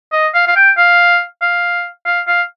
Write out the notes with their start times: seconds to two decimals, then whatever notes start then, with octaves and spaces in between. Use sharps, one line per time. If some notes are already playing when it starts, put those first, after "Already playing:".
0.12 D#5
0.34 F5
0.47 F5
0.56 G5
0.77 F5
1.42 F5
2.06 F5
2.27 F5